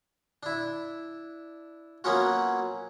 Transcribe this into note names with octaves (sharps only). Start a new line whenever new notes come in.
D4 E4
F#3 A#3 B3 C#4 F4 F#4